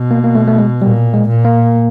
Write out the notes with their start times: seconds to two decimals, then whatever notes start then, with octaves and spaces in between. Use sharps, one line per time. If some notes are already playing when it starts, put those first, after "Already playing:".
Already playing: B2
0.11 A#3
0.24 A#3
0.35 A3
0.47 A3
0.58 G#3
0.82 A#2 G3
1.14 G#3
1.29 A#2
1.45 A#3